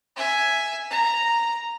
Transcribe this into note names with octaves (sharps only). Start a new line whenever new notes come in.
E5 G#5
A#5